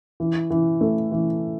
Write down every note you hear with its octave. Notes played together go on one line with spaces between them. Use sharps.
E3
E3
A3
E3